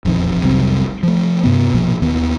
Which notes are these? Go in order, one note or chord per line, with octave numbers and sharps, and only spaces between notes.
E1 A#1 F2 D#3
F1 C2 F#3 C4
F3 A3
G2 C3 B3
A#1 B2 F3 A#3
D#2 D#3 B3